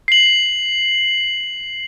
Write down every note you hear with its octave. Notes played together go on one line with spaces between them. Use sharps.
C7 F#7